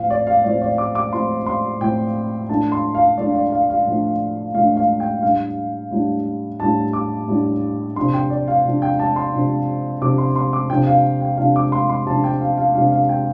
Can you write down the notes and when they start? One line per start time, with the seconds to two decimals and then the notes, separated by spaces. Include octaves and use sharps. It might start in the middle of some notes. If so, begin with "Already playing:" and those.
Already playing: A2 F3 C4 F5
0.10 D5
0.27 F5
0.44 A2 F3 C4 D5
0.62 D5
0.78 D6
0.95 D6
1.12 A2 F3 C4 C6
1.46 C6
1.81 A2 F3 C4 G5
2.49 A2 F3 A3 D4 A5
2.72 C6
2.95 F5
3.18 A2 F3 A3 D4 D5
3.34 D5
3.52 F5
3.70 F5
3.86 A2 F3 A3 D4
4.54 A2 F3 A3 D4 F5
4.77 F5
5.00 G5
5.23 A2 G3 D4 F5
5.91 A2 G3 D4
6.60 A2 G3 D4 A5
6.93 D6
7.28 A2 G3 D4
7.96 C3 F3 D4 C6
8.14 G5
8.30 D5
8.48 F5
8.65 C3 F3 D4
8.82 G5
8.99 A5
9.16 C6
9.32 C3 F3 D4
10.01 C3 F3 D4 D6
10.18 C6
10.36 C6
10.53 D6
10.70 C3 F3 D4 G5
10.87 F5
11.22 G5
11.38 C3 F3 D4 F5
11.56 D6
11.72 C6
11.89 C6
12.06 C3 F3 D4 A5
12.24 G5
12.41 F5
12.58 F5
12.75 C3 F3 D4 F5
12.92 F5
13.09 G5